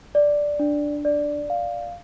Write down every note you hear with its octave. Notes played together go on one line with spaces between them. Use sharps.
D5
D4
D5
F5